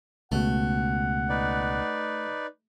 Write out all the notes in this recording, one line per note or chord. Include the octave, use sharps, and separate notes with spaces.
C#2 B2 A3 F#5
D#4 B4 D5